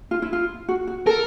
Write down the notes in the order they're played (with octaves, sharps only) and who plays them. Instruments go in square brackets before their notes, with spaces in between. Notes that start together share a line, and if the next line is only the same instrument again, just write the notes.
[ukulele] F4
E4
F4
F#4
F#4
[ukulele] A4 [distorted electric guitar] A#4